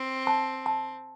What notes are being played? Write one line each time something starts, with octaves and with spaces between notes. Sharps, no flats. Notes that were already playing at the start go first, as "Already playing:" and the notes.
Already playing: C4
A5
A5